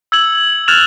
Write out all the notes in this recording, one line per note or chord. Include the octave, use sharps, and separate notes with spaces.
E6 G#6 F#7
F6 F#6 G#6 A6 E7 F7